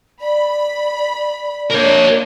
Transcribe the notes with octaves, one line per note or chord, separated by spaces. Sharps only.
D5 B5
A#3 D4 A#4 C#5